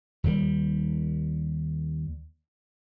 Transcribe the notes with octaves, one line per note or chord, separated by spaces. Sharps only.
D#2 G3